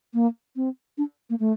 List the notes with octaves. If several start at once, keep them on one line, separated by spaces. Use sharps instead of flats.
A#3
C4
D4
A#3
A3